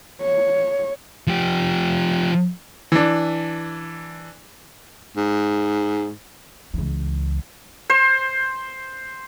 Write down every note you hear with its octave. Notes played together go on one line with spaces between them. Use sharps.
C#5
F3 G4
E3 D4
G#2
C#2 E3
C5